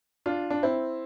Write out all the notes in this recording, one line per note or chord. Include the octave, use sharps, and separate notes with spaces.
D4 F4
D4
C4 E4